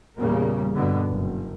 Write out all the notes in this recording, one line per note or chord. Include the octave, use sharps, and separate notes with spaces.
E2 A#2 C#3 G3 A#3
G2 B2 D3 B3
F#1